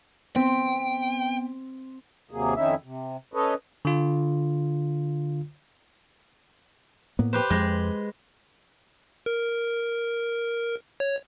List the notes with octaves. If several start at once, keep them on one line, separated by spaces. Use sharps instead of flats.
B3 C4 G5
D#2 C3 F#3 A#3 G#4
F2 D#3 C#4 D#4 E4 E5
C3
C#4 A4 B4 C#5 D#5
D3 F4
A2 A#3 B3
G4 B4 C5
F2 G#3
A#4
C#5